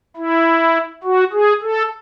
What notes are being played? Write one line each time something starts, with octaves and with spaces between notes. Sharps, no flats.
E4
F#4
G#4
A4